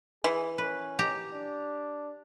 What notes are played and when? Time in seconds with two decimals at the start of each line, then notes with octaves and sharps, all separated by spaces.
0.24 E3 G#4
0.58 C#4 B4
0.99 G4 A#5
1.33 D4